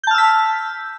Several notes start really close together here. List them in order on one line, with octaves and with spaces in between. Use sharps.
G6 A5 F6 E6 B6